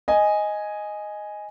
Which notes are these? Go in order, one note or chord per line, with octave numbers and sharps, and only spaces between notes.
D#5 G#5